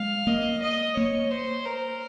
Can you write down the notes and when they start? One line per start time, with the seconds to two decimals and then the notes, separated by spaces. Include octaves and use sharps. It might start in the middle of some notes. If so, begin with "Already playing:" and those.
Already playing: G#3 F5
0.27 A#3 D#5
0.62 D#5
0.96 A#3 C#5
1.31 C5
1.66 A#4